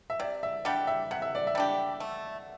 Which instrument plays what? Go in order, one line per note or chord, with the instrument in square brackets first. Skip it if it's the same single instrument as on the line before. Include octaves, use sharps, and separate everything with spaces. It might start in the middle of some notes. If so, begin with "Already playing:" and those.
[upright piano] E5
[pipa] C3 [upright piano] D5
[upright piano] E5
[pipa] G3 D4 G4 [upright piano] F#5
[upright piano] E5
[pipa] C3 [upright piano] F#5
[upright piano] E5
D5
E5
[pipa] G3 D4 G4
A3